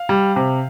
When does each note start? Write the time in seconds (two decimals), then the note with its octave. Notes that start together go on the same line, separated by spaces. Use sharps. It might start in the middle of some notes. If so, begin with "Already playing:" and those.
Already playing: F5
0.09 G3
0.36 C3